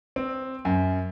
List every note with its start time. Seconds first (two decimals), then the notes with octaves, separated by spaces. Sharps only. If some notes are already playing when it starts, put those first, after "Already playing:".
0.16 C4
0.65 F#2